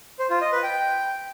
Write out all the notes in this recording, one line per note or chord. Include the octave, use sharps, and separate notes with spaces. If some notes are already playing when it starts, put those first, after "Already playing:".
C5
F4
D#5
B4
G5